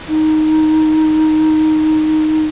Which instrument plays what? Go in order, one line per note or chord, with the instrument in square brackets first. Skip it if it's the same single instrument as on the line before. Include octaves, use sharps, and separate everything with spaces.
[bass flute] D#4